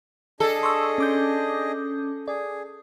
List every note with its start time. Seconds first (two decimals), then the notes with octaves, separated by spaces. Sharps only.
0.40 D4 G#4 A4 D#5
0.63 C6 C#6 E6
0.98 C#4 D6 G6
2.28 G#4 D5